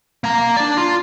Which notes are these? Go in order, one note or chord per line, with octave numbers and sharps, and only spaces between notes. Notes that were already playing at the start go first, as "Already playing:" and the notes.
A#3 A#5
D4 D5
F4